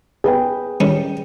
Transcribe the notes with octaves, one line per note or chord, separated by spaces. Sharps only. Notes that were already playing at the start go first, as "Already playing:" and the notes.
G#4 B4 G5
D#3 G3 C#4